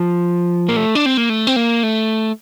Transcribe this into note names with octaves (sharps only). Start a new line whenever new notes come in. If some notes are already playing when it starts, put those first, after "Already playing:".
Already playing: F3
A#3
A3
D4
C4
A#3
A3
C4
A#3
A3